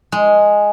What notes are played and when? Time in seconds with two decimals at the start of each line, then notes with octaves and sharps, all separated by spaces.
0.12 G#3